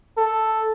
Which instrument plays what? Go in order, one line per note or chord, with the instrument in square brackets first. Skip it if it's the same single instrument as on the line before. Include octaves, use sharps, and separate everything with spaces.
[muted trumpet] A4